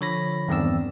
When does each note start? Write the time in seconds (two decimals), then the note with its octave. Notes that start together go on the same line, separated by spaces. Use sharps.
0.01 D3 F3 C#5 B5 A#6
0.48 E2 G2 D#3 C4 D5 E6